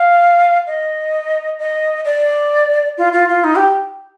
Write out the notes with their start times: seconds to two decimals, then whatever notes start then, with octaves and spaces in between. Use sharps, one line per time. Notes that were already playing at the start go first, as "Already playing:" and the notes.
Already playing: F5
0.67 D#5
1.59 D#5
2.05 D5
2.98 F4
3.13 F4
3.29 F4
3.44 D#4
3.55 G4